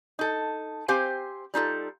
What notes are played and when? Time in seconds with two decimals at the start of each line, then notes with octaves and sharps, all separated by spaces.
0.19 D#4 A4
0.88 C4 G4 C5 F5 G#5
1.54 G3 D#4 F4 A4